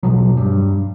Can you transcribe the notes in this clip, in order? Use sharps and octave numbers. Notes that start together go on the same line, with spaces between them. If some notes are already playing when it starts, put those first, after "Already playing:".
D#1 A#1 B2 F#3
G2